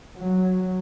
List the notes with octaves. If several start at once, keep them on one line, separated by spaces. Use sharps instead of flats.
F#3